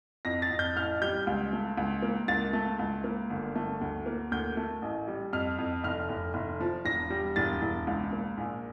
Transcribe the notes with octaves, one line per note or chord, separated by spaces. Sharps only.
F2 A#6
A6
F2
G6
A1 F6
G3 G6
C#2
A3
C#2
A#3
C#2 A6
A3
C#2
A#3
G1
A3
D2
A#3
D2 G6
A3
A1
G3
F2 F6
F2
F1 F6
F1
F1
F3
E1 A#6
G3
E1 A6
E1
C#2
A#3
A#1